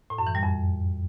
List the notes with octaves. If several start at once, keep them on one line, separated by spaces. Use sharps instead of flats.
A2
F#2
E3
G3
F2